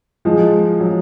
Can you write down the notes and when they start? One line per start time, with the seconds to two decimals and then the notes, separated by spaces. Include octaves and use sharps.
0.25 F3 G#3
0.80 F#3